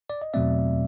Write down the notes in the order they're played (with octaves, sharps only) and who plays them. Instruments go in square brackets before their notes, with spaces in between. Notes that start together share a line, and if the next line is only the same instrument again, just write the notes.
[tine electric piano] D5
D#5
E2 B2 F#3 A3 C4 D5 E5